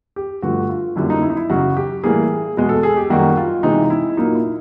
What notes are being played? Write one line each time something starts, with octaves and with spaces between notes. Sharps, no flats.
G4
G2 D3 F3 A3 F#4
F4
F#2 D3 G3 A#3 E4
D#4
E4
D#4
E4
F#2 C#3 F#3 F#4
G4
A2 E3 G3 A#3 G#4
E2 B2 G#3
A4
G#4
G4
F#2 D#3 G3 A#3 F#4
F4
C3 E3 G#3 D#4
E4
A#2 F#3 A#3 D#4
E4